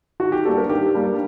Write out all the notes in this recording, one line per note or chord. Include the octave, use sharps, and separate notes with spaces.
D#3 F#4
G4
G3 A#3 D4 A4
A#4
D#3 G4
G3 A#3 D4